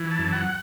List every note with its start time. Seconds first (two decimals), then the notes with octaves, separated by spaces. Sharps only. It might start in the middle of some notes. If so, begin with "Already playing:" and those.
Already playing: E3
0.11 A5
0.19 F#2
0.33 F#5